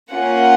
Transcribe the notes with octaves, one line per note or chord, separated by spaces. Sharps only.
A#3 C#4 F4 F#5